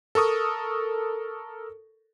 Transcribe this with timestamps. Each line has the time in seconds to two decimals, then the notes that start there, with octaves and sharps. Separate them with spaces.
0.15 A4 A#4 C#6 D#6